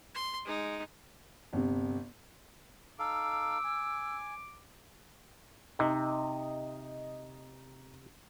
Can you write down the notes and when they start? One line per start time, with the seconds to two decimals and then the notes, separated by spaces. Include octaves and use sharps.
0.15 C6
0.45 G#3 D#4
1.53 G1 C3
2.99 D#4 A4 F5 D6 E6
3.64 G#5
5.79 C3 D#4 D#5